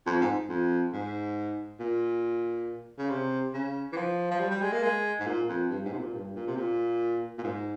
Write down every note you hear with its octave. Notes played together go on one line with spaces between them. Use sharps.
F2
G#2
F2
G#2
A#2
C#3
C3
C#3
E3
F3
F3
G3
G3
G#3
A#3
G#3
G#2
A#2
F2
G2
G#2
C3
A#2
G2
A#2
C3
A#2
A#2
G#2